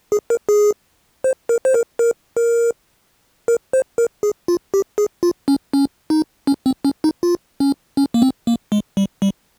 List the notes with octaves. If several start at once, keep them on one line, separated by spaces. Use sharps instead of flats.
G#4
A#4
G#4
C5
A#4
C5
A#4
A#4
A#4
A#4
C5
A#4
G#4
F4
G4
G#4
F4
C#4
C#4
D#4
C#4
C4
C#4
D#4
F4
C#4
C#4
A#3
C4
A#3
G#3
G3
G3